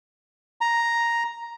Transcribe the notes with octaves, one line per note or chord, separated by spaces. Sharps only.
A#5